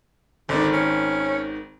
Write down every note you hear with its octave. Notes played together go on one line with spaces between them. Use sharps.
G#1 D3 D#3
C#4